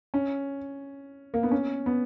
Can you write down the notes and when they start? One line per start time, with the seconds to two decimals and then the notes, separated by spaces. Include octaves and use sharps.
0.14 C#4
1.34 A#3
1.43 B3
1.51 C#4
1.86 B3